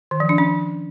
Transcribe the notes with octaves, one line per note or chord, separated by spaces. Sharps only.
D#3
F3
D4
C#4